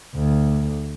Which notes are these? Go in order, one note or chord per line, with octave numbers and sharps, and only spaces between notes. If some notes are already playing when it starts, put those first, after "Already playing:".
D2